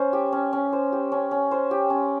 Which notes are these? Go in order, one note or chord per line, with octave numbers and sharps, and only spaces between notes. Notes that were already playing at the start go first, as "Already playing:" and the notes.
Already playing: C#4 C5
G4
C#4
C#4
C5
G4
C#4
C#4
C5
G4
C#4